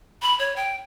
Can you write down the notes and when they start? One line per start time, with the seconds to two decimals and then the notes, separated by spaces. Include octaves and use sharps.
0.22 B5
0.39 C#5
0.56 G5